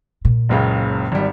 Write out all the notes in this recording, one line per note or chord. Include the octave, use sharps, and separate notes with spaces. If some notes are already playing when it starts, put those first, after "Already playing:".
A#2
F#1 C#2 C#3
G#1 G3